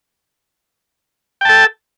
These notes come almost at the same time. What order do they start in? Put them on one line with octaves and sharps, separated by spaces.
G5 A5 A4